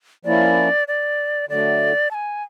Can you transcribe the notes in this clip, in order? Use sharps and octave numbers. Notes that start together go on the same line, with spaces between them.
F3 A#3 C#4 E4 D5
D5
D3 F#3 A3 D5
A5
G#5